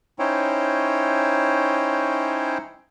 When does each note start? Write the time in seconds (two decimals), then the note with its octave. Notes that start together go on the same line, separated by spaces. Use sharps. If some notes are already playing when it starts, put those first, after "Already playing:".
0.19 C#4 D#4 E4 C5 C#5 G5